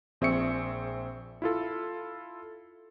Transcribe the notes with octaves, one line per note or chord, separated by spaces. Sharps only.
A#1 C4 G#4 E5 C#6 C#7
E4 F4 A4